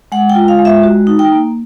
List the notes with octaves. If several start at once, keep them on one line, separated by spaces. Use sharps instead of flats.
G#3 F#5
G5
F4
F5
G#3
E5
F#4
D#4
G5
A#3